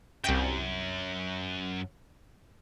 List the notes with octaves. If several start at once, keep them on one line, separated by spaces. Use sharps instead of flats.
C2 F#2 G5